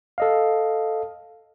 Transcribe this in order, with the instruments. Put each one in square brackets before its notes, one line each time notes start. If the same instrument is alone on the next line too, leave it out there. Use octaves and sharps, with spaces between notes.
[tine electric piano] A4 D#5 F5